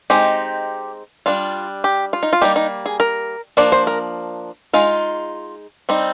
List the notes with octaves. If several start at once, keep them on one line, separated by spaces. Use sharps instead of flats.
G#3 C4 D#4 G4
G3 D4 F4
G4
F4
D#4
F4
G3 A#3 D#4 G4
D#4
G#4
A#4
F3 A#3 D4 D5
C5
A#4
G#3 D#4 F4
G3 C4 D#4